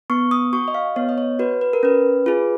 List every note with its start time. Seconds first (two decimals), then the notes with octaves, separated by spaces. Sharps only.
0.10 B3 C#6
0.31 D#6
0.53 F#4 C#6
0.68 D#5
0.74 F5
0.96 B3 C#5
1.09 D#5
1.18 C#5
1.39 F#4 B4
1.61 B4
1.73 A#4
1.83 C#4 B4
2.26 F4 G#4